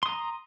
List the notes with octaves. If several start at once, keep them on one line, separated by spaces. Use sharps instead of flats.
A#5 C6 D#6